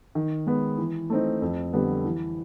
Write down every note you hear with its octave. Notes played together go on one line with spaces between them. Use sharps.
D#3
G#3 B3
E3
A3 C4 D#4
F2
D3 G3 B3
E3